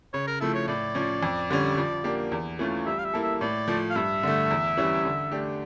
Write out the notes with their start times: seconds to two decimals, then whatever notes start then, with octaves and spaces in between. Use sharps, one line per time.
0.13 C#3 C#5
0.27 A#4
0.40 F3 A3 E4 A4
0.54 C#5
0.68 A2 D5
0.95 F3 C#4
1.23 F2
1.50 D3 G3 C#4
1.77 F3
2.04 A#3 D4 G4
2.32 E2
2.59 E3 A3 C#4 F4
2.86 G3 E5
2.99 F5
3.04 E5
3.13 A#3 E4 A4
3.22 E5
3.41 A2 D5
3.68 F3 A3
3.90 F5
3.96 G2 E5
4.23 D3 A3
4.51 E2
4.77 E3 G3 C#4
5.05 D3
5.32 A3 D4 G4